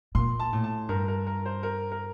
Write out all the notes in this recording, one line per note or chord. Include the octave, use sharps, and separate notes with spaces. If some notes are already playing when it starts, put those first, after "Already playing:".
A#2 C6
A5
A2
A5
G2 A#4
A#4
A#4
C5
A#4
A#4